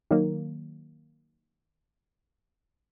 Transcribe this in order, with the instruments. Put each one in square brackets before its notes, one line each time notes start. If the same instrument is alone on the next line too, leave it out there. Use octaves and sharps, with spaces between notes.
[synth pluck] D#3 F#3 A#3